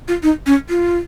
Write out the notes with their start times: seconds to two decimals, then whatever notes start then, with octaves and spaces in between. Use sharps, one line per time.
0.08 F4
0.23 D#4
0.46 C#4
0.69 F4